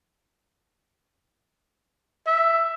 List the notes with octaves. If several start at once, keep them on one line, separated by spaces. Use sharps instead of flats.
E5